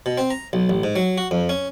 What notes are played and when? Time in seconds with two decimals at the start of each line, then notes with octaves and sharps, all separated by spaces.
0.06 B2
0.18 C4
0.31 A#5
0.53 B1
0.69 A1
0.84 G#2
0.96 F#3
1.18 F#4
1.31 F2
1.49 C#4